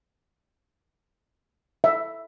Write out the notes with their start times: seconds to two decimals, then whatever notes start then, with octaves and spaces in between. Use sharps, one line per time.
1.84 E5